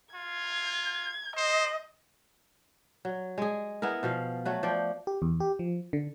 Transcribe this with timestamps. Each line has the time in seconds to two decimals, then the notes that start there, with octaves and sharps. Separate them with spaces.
0.15 F4 G#6
1.36 C5 D#5
3.05 F#3
3.38 G#3 G#4
3.82 B3 E4 G#4 A#4
4.03 B2 F3 F5
4.45 F#3 A3 B4
4.63 F3 D5 G5
5.07 G4
5.22 E2
5.40 G4
5.59 F3
5.93 D3